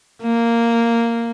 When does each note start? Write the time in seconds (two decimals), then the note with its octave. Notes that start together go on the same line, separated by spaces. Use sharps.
0.23 A#3